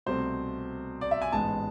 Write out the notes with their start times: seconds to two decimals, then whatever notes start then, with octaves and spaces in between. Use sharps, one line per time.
0.06 C2 B2 A3 C4 C5
1.01 D5
1.11 E5
1.22 G#5
1.32 A1 G#2 G#3 B3 A5